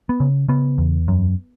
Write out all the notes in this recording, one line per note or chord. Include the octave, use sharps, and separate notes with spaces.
B3
C#3
C#3 B3
E2
F#2